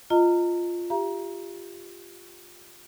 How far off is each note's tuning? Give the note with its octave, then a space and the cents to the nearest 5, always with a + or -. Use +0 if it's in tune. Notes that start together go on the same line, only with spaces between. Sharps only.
F4 +0 D#5 +0 A#5 -30
G4 +10 E5 +45 A#5 +20